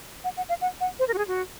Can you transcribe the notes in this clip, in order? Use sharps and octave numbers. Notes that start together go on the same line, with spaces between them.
F#5
F#5
F5
F#5
F#5
C5
A#4
F#4
G#4
F#4